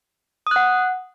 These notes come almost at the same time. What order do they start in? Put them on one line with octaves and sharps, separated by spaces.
D#6 F#6 F#5